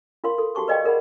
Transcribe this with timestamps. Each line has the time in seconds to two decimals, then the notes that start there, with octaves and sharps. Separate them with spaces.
0.24 F4 A#4 F5 C6
0.38 A4
0.55 F#4 G4 A5 C#6 D6
0.67 A#4 B4 D5 D#5 F5 G5
0.84 G#4 A#4 D5 F#5 B5